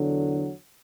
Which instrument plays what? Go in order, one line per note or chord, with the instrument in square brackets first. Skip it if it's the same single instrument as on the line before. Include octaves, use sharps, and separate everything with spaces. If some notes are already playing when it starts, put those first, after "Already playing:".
Already playing: [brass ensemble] E2 D3 F#3